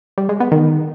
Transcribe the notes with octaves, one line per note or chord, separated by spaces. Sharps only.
G3
G#3
B3
D#3